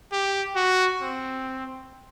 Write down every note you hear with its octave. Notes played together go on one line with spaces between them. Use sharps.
G4
F#4
C4